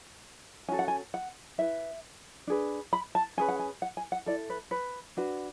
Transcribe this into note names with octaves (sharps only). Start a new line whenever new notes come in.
C#4 F#4 A4 G#5
F#5
G#5
F#5
E4 B4 E5
D4 G#4 B4
B5
A5
C#4 G#4 B4 G#5
F#5
G#5
F#5
G#5
F#5
E4 A4 D5
B4
B4
D4 F#4 B4